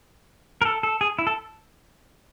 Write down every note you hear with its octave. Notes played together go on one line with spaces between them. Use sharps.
A#4
A4
A4
G#4
E4
A4